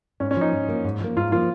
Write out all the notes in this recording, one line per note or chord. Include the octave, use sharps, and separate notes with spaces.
G#2 C#4
C#4
F3 A#3 D#4
G#2
F3 A#3
G#2
F3 A#3
G#2 F4
F3 A#3 F4